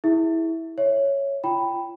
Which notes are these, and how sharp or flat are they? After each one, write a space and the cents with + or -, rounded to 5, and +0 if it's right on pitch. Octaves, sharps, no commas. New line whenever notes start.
E4 -15 G#4 +0 E5 +0
C#5 +0 E5 +5
F4 -35 G5 +0 B5 +0